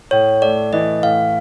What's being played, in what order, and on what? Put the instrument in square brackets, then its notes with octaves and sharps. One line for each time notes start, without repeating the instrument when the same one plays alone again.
[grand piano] A2 [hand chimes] C#5
[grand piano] A3 [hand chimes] D5
[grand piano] E3 [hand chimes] D#5
[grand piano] A2 [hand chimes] F5